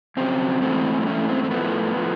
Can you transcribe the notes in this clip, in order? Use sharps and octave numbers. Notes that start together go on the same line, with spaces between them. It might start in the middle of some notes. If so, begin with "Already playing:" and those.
F2 C#3 F#3 C4
G#2 E3 A3 C4
C4
G#2 E3 A3 C#4
C4
C4
A2 F3 A3 B3
A2 F3 A3